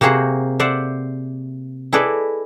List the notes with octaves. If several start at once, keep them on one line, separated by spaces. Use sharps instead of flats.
C3 A#3 F#4 G#4 C5 F#5
C5 D5 E5 F#5
E4 G#4 A4 B4 D5 D#5